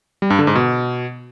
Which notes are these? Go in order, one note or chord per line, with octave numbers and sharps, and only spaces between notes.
G3
G2
D3
G#2
B2